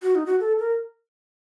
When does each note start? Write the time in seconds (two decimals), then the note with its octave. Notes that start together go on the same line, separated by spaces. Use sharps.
0.02 F#4
0.15 D#4
0.26 F#4
0.40 A4
0.59 A#4